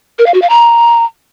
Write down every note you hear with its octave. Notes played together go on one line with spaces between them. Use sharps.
A#4
F5
F#4
F5
A#5